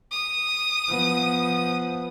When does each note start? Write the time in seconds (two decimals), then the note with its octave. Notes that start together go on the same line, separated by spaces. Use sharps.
0.11 D#6
0.89 F3 B3